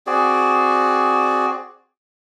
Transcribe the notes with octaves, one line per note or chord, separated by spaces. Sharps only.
C4 F#4 G#4 D5